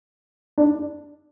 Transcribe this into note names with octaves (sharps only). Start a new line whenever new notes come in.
D4